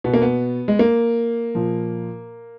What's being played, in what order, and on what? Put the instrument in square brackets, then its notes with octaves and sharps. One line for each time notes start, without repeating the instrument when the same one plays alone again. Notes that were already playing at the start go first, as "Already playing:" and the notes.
[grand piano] B2 B3
A#3
B3
G#3
A#3
A#2 F3